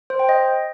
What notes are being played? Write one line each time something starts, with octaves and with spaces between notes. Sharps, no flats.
C5
G5
D#5